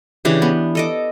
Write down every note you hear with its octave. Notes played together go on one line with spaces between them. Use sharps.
C#3 E3 D4 G4
B3
A4 D#5 D6